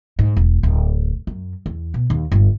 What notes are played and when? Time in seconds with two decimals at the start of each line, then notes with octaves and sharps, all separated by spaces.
0.19 G#2
0.37 E1
0.63 D1
1.27 F#2
1.66 E2
1.94 B2
2.10 D#2
2.32 G1